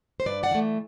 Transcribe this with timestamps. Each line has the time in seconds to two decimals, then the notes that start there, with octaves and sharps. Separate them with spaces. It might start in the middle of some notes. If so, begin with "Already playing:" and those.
0.20 C5
0.26 G2 B4 D5
0.43 D5 F#5
0.51 E3 A3